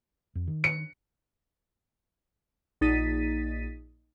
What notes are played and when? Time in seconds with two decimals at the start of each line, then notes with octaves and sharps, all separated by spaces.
0.35 F2
0.47 D#3
0.64 C#7
2.81 A#1 D#4 A6 B6 D#7